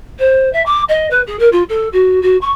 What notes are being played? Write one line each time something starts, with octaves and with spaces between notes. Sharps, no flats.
C5
E5
D6
D#5
B4
G#4
A#4
F4
A4
F#4
F#4
C#6